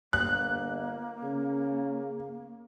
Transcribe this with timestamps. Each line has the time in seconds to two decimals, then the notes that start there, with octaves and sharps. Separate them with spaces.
0.13 G1 A#3 F#6
1.23 C#3